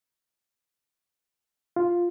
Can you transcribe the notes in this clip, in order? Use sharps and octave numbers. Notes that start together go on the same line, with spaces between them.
F4